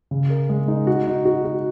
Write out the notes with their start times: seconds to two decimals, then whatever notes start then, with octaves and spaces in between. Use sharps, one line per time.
0.11 C#3
0.30 A#4
0.49 G#3
0.68 D#4
0.87 F#4
1.07 D#4
1.25 F#4
1.45 F#4